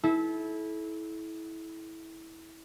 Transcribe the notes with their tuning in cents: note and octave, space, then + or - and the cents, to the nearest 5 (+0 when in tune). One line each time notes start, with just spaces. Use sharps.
E4 -20 A4 -35